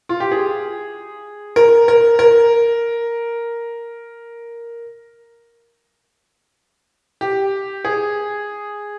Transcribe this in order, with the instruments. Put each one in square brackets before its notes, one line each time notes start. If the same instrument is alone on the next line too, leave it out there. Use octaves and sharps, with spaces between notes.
[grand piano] F4
G4
G#4
A#4
A#4
A#4
G4
G#4